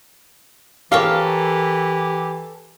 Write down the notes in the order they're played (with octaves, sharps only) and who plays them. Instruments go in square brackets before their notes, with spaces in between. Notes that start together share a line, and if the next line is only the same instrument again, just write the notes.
[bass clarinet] E3 [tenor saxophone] G4 [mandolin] A4 A#4 C#5 [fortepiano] F5